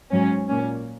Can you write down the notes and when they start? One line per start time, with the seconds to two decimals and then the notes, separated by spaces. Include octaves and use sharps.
0.11 G#2 F#3 C#4
0.48 A#2 A#3 C#4